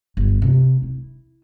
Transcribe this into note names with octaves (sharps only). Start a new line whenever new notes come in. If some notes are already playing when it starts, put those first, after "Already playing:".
G1
C3
E4